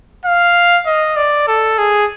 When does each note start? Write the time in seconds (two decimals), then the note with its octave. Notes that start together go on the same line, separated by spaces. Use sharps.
0.25 F5
0.86 D#5
1.16 D5
1.48 A4
1.78 G#4